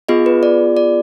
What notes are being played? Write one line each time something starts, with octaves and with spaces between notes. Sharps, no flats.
B3 F4 G#4 D#5
B4
D5
D5